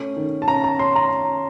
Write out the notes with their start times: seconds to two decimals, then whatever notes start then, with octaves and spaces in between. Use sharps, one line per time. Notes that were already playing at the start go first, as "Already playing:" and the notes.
Already playing: A3 C#4
0.16 D#3
0.42 A5
0.48 C#4 A#5
0.64 A#5
0.79 C#4 C6
0.96 A#5